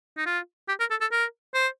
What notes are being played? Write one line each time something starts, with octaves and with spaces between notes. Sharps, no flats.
D#4
F4
G4
A#4
A4
A4
A#4
C5